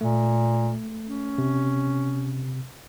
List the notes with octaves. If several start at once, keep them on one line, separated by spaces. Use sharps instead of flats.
A#2 A3
C#4
C3